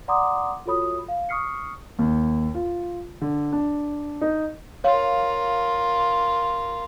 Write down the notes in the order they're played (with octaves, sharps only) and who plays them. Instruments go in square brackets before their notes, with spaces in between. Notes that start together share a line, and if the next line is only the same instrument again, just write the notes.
[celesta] D5 F#5 A#5 C6 D6 D#6
F4 F#4 A4 C#5 B5 D#6
F5
C#6 D#6 F6 C7 C#7
[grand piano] D#2
F4
D3
D4
D#4
[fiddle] F4 A#4 [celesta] C#5 F5